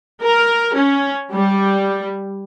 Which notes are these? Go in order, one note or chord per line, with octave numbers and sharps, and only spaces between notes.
A#4
C#4
G3